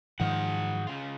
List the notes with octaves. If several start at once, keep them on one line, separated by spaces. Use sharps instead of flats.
G#2 D#3 F3 F#3 G#4 F#5
C#3 F4